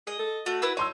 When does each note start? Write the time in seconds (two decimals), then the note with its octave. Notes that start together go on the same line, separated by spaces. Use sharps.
0.07 G#4 D#5
0.19 A4
0.46 A3 F#4
0.62 E4 B4 E6
0.77 D#4 C#5 C6 E6